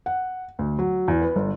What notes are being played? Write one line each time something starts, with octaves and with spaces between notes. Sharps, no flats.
F#5
D2
F#3
E2
B4
G1